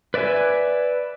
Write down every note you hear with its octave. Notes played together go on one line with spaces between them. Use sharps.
B4 D5 E5 G#5